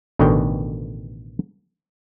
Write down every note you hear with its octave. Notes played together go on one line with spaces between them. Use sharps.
A1 B2 D3 D#3 C#5 G5